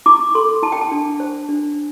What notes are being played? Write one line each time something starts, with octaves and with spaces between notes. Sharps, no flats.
E4 D6
A4 C6
E4 A5
G5
A5
D4
C5
D4